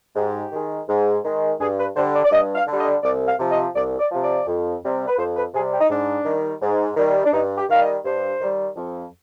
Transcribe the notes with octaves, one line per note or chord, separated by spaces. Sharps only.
G#2 G4
D#3 G#3
G#2
D#3 G#3
G2 G#4
B4
D3 G3 C5
D5
D5
G2 D#5
F5
D3 G3
D#5
C2 D5
F5
C3 F3
D#5
C2 D5
D5
C3 F3
D5
F2
C3 G3
B4
F2 C5
B4
C3 G3 G#4
G4
D#4
G#2 D4
D#3 G3
G#2
D#3 G3
D4
G2 D#4
G4
D#3 G3 F5
D#5
G2 C5
D#3 G3
F2